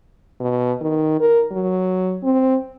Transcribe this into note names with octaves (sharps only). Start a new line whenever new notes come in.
B2
D#3
A#4
F#3
C4